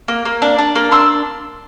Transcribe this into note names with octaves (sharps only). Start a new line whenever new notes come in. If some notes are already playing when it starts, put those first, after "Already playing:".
A#3
A#3
D4
D4
A#3
D4 C6 E6